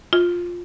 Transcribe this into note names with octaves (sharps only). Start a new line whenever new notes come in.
F4